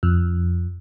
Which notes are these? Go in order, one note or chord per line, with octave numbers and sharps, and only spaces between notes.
F2